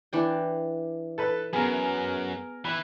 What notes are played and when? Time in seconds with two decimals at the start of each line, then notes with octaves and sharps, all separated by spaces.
0.13 E3 D4 G5
1.18 A4 B4 B5
1.53 F#2 B3 G#4 A#4
2.65 E3 B5